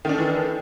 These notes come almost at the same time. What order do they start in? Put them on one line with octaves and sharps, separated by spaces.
D#3 D4 A4 E3